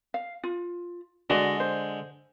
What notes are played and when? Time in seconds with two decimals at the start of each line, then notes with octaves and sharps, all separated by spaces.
0.14 F5
0.44 F4
1.30 D3 G#3 F#4 D5 D#5
1.60 C5